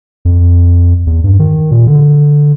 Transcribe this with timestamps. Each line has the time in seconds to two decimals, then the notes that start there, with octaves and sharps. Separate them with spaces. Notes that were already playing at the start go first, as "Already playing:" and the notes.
0.25 F2
1.07 E2
1.24 G2
1.39 D#3
1.71 A#2
1.87 D3